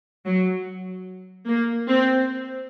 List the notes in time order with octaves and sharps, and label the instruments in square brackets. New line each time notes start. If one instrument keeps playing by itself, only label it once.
[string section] F#3
A#3
C4